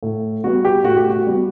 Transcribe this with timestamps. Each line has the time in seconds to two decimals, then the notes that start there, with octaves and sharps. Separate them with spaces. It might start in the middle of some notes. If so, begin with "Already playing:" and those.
0.03 A2
0.44 G3 B3 F#4
0.65 G4
0.84 A2 F#4
0.97 G4
1.10 F#4
1.27 G3 B3